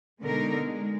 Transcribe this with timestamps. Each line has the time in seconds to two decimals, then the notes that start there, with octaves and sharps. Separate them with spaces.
0.20 B2 D3 G#3 D#4 A#4
0.59 G#3